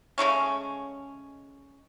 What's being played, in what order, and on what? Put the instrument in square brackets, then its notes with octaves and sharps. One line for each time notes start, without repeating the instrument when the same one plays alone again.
[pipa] C#3 G#3 A3 C#4